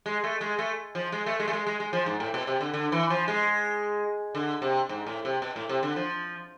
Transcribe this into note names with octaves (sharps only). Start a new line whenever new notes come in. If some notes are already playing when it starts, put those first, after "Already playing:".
G#3
A3
G#3
A3
F3
G#3
A3
G#3
A3
G#3
G#3
G#3
F3
G#2
A2
B2
C3
D3
D3
E3
F3
G#3
D3
C3
G#2
A2
C3
B2
A2
C3
D3
F3